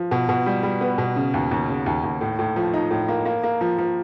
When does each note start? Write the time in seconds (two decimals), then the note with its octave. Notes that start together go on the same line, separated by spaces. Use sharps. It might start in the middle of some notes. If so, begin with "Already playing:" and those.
Already playing: F3
0.11 B2
0.29 B2
0.46 G3
0.63 G3
0.81 B3
0.98 B2
1.16 C#3
1.34 D#2
1.51 D#2
1.69 C#3
1.86 D#2
2.04 D#2
2.21 A2
2.39 A2
2.56 F3
2.74 D#4
2.91 A2
3.08 A#3
3.26 A#3
3.44 A#3
3.61 F3
3.78 F3